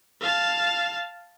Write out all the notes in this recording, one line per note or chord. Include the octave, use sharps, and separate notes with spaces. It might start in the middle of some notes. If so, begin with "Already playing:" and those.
F5 A5